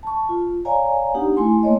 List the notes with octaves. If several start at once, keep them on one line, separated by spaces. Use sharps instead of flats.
A5 C#6
F4
C#5 D5 F5 G#5 A#5
B3 D4 D#4 G4 F#5
A3 E4 G#5 C6
A3 A#3 C#5 D#5